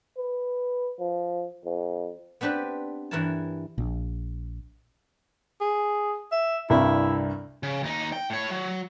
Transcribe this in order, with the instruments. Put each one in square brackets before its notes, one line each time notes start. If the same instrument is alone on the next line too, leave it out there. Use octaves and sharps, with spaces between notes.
[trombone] B4
F3
F2
[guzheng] B3 C4 D4 G4 B4
G2 E3 E4 A#4 C#5 A5
[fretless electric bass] A#1
[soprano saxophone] G#4
E5
[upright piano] C2 G2 [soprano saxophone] E4
[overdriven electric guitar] C#3
D#2 D#4
G5
A2 C#5
F#3